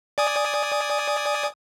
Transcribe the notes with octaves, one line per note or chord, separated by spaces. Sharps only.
D5 G#5 D#6